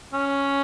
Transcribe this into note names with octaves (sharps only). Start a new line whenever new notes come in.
C#4